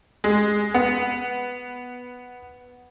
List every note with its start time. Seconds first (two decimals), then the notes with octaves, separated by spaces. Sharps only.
0.24 G#3
0.74 B3